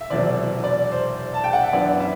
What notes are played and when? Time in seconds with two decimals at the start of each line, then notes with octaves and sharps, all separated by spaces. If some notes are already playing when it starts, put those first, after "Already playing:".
0.01 E5
0.10 E1 E2 C3 F#3 C4 D5
0.64 D5
0.91 C5
1.34 A5
1.44 G5
1.53 F#5
1.63 E5
1.73 F#2 E3 B3 D4 D5
2.00 E4